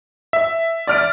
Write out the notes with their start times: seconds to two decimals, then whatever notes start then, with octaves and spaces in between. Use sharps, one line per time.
0.33 E5
0.87 D5 F6 D7